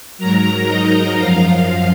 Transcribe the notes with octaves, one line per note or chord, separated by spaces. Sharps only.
G#2 F#3 A#4 A#5
D#4 D#5
F#2 F3 F4 F5